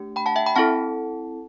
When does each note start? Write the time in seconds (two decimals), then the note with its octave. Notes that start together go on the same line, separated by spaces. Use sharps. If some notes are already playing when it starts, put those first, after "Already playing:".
Already playing: A3 D4 G4
0.16 G5 B5
0.26 F#5 A5
0.36 E5 G5
0.46 G5 B5
0.56 C4 E4 A4 F#5 A5